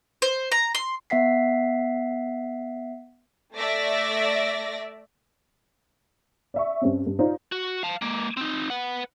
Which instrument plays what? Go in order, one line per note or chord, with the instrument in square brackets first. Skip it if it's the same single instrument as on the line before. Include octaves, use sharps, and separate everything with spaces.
[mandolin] C5
A#5
C6
[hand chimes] B3 E5 F#5 B6 C7
[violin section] A3 D5 E5 A#6
[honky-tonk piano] D5 E5 C#6
G2 C4 C#4
G2
D#4 F4 C5 D5
[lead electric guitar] F#4
F5 A5
G#3 A#3
C4 D#4
B4 F#5